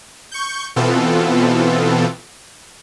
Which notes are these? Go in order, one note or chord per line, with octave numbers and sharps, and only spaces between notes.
C#6 G6
B2 E3 B3 C4 F4 A4